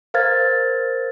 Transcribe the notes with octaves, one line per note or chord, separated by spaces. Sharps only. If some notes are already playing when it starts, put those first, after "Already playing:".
A#4 C5 F5 F6 G#6 A6